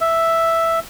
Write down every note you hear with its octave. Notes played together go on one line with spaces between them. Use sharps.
E5